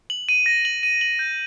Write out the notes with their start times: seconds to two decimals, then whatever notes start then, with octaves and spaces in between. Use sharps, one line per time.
0.10 F#7
0.29 D#7
0.46 A#6
0.65 F#7
0.83 D#7
1.01 F#7
1.19 G6